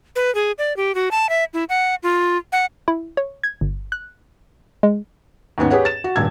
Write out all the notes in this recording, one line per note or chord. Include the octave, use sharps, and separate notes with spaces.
B4
G#4
D5
G4
F#4
A5
E5
E4
F#5
F4
F#5
E4
C#5
G#6
G1
F#6
G#3
D#2 G#2 B3 C#4
G4 G#4 B4 C#5 F#5
A6 E7
F#4
D#1 G2 E6 G#6